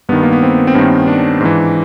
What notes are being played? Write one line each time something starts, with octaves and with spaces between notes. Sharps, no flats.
G2 D#3 B3
A#3
B3
C4
C4
G2 D#3 C#4
D4
G#2 E3